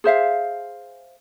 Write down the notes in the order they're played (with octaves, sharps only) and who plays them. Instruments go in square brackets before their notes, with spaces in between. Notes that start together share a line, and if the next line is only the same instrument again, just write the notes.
[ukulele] G#4 C5 E5 F5